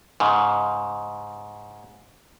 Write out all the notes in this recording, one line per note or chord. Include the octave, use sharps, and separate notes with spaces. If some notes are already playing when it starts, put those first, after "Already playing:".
G#2 C#3